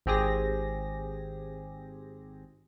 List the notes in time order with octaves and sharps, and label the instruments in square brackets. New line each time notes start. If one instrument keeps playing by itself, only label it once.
[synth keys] G#1 C4 G4 G#4 A#6